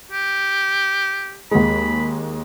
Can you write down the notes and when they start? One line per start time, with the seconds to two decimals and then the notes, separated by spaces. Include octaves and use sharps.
0.12 G4
1.51 D#2 G#3 B5